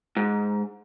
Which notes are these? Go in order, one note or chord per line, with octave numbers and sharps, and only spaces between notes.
G#2